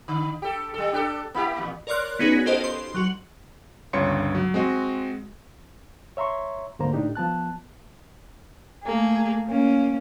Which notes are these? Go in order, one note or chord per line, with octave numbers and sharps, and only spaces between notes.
D3
G4 A4
G3 A4
D4 G4 A4
A#3 E4 G4
E2 A#2
A#4 C#5 D5 C6 F6 F#6
B3 C#4 D#4 F#4 G#4 B4
F4 G4 A4 C5 D#5
C6
F#3 F#4
G1 C#2 G2 C#5 C6 C#7
F#3
G#3 C4 F#4 D#5
C#5 E5 A#5 C6 C#6
D2 G#2 D3 A#3 C5 A#5
A2 D4 D#4 G4
F3 B3 A5 F#6
A3 A#3 G#4
A#3 C#4